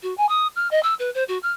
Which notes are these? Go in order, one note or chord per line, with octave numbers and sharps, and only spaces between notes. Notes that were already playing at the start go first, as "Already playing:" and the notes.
F#4
G#5
D#6
F6
D#5
E6
B4
C5
F#4
F6